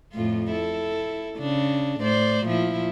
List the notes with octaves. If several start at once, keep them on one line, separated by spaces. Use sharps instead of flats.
F2 A2 F4
E4 A4
C#3 D4
A2 C5 D5
A#2 F3 E4